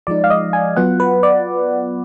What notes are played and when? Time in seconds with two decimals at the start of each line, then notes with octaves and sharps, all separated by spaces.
0.07 F3 G#3 D#4 D5
0.24 F5
0.30 D#5
0.53 G#5
0.76 F#3 B3 F4 F#5
1.00 B4
1.23 D5